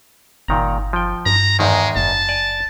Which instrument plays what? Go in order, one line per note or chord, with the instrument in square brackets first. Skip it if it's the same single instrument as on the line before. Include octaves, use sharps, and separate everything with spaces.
[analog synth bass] G1 [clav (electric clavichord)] A#2 D#3 A#5
[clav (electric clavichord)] F3 G5
[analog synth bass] G2 [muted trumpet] A#5
[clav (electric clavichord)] E2 G#2 D#3 [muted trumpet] G#3
[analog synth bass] F#1 [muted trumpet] A5
[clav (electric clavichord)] D5 G#5